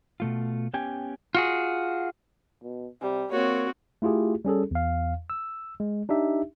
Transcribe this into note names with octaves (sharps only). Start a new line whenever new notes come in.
B2 A3 F4
B3 C#4 G4 G5 G#5
F4 F#4 G#4
B2
C3 G3
A#3 C4 F#4 C#5
A3 E4 F4 G4 G#4
G3 C#4 G#4 A4
E2 F5
E6
G#3
D4 D#4 G4 E5